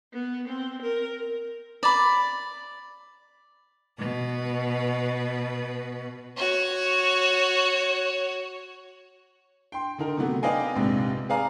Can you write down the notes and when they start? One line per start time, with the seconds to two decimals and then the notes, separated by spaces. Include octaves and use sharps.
0.13 B3
0.48 C4
0.82 A#4
1.83 D5 B5
3.97 B2 B4
6.36 F#4 C#5
9.72 G5 C6
9.98 D3 D#4 A#4
10.17 C3 F#3 A3 B3
10.43 B4 D5 D#5 F5 G5 G#5
10.76 A#1 G#2 C3
11.29 G#4 B4 D5 F5 G#5 A#5